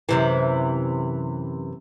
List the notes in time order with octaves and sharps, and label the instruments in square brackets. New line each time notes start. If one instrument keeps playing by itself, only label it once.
[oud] F#2 C3 E3